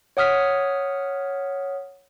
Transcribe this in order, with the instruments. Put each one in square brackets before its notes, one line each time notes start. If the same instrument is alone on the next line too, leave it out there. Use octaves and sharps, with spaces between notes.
[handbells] C#5 F#5 D#6 F6 B6